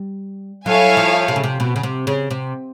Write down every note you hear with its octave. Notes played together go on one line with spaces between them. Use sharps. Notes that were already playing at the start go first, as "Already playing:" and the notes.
Already playing: G3
F#3 E4 A4 C#5 F5 G#5
F3
C3
C#3
C3
B2
C#3
C3
C#3
C3